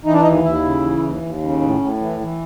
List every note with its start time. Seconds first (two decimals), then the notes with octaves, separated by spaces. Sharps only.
0.05 E3 D#4
0.13 D4
0.21 D#4
0.24 D#2
0.44 D#2 E4
0.63 C#3
0.83 E3
1.03 D#2
1.22 D#2
1.41 C#3
1.61 A2
1.81 A2
2.00 E3
2.20 E3